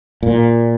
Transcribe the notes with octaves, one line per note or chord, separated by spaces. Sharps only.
A#2